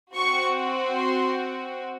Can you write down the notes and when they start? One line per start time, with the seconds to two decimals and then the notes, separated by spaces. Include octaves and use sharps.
0.15 C4 F#4 C#6
1.00 C6